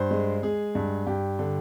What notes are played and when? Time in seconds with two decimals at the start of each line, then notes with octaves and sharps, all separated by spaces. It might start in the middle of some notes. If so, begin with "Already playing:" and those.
Already playing: G2 C5
0.11 G#3
0.43 G#3 G#4
0.75 G2
1.06 G2 G4
1.39 D3